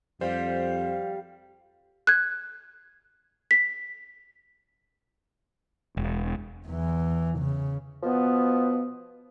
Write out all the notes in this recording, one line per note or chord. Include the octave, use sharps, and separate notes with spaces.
F2 G3 C5 F5
F#6 G#6
B6
E1
E2 E3
C#3
B2 F3 B3